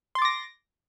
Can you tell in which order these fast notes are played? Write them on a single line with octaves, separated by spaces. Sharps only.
C6 A6 D6 A#6